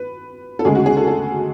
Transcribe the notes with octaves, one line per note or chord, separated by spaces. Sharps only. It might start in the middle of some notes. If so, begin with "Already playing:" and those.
Already playing: B4
A4
D2 C#3 G#3 G#4
F#4
G#4
A4
A4